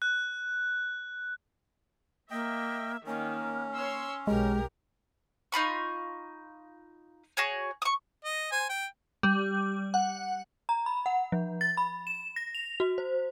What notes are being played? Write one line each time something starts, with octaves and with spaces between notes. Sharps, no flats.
F#6
A#3 D#5 E5 G5
D#3 A#3 C#4
C#5 C6 E6
B1 G#3 G4 A#4
D#4 F4 B5 C#6
F#4 G#4 C#5
C#6 D#6
D#5
C5 G#5
G5
G3
F#5
A#5
B5
F#5
F3
A6
B5
E7
A#6
F7
F#4
C5